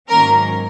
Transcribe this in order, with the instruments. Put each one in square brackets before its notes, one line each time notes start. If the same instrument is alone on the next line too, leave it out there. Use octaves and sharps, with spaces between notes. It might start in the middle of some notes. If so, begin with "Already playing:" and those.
[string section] G#2 D#3 F#3 A#3 C#4 A#4